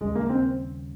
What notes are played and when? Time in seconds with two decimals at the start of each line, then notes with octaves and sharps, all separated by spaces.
0.01 D#2 C#3 G3 G#3
0.15 A#3
0.30 C4